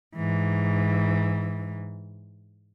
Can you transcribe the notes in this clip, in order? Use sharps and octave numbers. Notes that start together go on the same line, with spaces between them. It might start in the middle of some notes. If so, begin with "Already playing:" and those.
G#2 E3